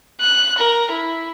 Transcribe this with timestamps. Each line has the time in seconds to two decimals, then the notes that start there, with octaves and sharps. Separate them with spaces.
0.21 F#6
0.58 A#4
0.92 E4